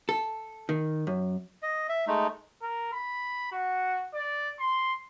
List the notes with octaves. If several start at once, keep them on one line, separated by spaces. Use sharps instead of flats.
A4
D#3
F#2
D#5
E5
G#3 A3 D#4
A#4
B5
F#4
D5
C6